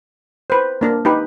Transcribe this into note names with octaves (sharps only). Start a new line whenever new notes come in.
B4 C5
A#3 D4 A#4
D#4 G4 B4